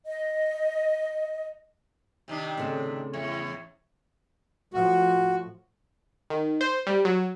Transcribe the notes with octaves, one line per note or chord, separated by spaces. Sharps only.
D#5
C3 D#3 D4
A2 C#3 B3 C4 A4 C#5
E2 C#5 E5
A2 F3 F#4
D#3
C5
G3
F#3